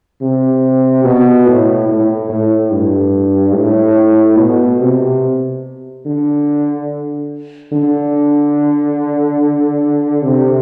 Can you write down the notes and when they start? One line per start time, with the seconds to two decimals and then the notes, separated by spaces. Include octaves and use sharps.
0.21 C3
1.04 B2
1.47 A2
1.88 A2
2.29 A2
2.71 G2
3.54 A2
4.38 B2
4.80 C3
6.06 D3
7.72 D3
10.23 C3